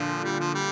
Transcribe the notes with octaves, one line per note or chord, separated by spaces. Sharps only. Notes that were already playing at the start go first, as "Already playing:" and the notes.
Already playing: A#2 D3 F3
G3
F3
G3